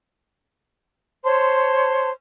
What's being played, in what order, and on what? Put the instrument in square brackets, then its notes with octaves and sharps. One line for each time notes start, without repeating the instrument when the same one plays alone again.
[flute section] C5 C#5 A5 C6